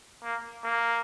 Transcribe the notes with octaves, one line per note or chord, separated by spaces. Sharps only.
A#3
A#3